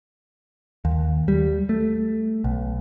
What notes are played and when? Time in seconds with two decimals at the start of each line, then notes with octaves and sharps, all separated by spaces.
0.85 D#2
1.28 G3
1.69 A3
2.44 B1